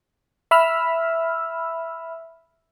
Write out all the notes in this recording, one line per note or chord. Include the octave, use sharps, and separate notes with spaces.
E5 B5 E6 F6